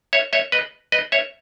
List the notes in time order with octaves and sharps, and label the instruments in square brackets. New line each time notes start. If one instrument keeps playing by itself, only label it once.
[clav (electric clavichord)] C#5 E5
C#5 E5
B4 D#5
B4 D#5
C#5 E5